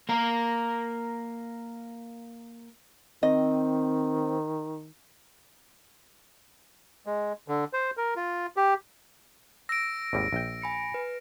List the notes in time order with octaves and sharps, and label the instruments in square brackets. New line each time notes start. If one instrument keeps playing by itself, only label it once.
[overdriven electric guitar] A#3 A#4
[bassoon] D#3 [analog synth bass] C4 [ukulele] D#5
[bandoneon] G#3
D3
C5
A#4
F4
G4
[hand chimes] E6 [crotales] A#6 D7
[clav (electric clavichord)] G#1 D#2 G3
A#1 G5
[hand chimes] G#5 B5 C#7
B4